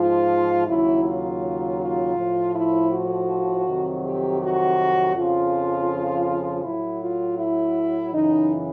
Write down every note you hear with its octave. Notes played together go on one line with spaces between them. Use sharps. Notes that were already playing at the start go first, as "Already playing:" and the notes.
Already playing: G#2 F3 F4
D#2 C#3 F#3 E4
F4
F4
A2 F3
E4
F#4
F2 C3 D#3 F#3
G4
F#4
F2 C#3 F3 F4
A2 F#3 E4
F4
E4
F#2 C#3 E3 D#4